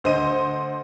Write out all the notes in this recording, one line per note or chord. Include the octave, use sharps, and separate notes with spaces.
D2 C5 D#5 D#7